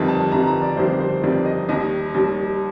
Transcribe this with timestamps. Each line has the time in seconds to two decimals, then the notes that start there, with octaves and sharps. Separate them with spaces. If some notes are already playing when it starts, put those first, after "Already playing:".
Already playing: G1 F2 D#3 G3
0.08 A5
0.32 G1 F2 D#3 G3 A#5
0.47 A#5
0.62 D5
0.77 G1 F2 D#3 G3 C5
1.00 C5
1.23 G1 F2 D#3 G3 D5
1.45 D#5
1.69 D#2 D#3 G3 D#5
2.14 D#2 D#3 G3